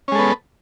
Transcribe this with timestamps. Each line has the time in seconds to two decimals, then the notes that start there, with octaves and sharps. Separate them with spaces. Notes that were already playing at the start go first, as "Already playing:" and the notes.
0.08 C#4
0.12 G#3
0.15 A4
0.19 B3